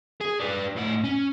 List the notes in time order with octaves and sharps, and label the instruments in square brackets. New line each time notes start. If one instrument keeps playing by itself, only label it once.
[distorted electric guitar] G#4
D4 B4
A2 F#5
C#4